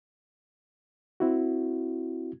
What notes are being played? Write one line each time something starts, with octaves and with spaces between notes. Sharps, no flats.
C4 E4 F#4